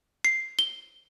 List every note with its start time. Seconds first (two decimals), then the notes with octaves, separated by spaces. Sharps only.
0.25 C7
0.59 G7